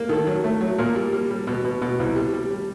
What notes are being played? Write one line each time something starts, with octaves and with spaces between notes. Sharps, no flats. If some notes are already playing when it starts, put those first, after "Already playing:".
Already playing: A#3
D#3 A4
F#3
A3
F#3
A#2 A#4
G3
G3
G3
B2
B2
B2
C2
G3
G3
G3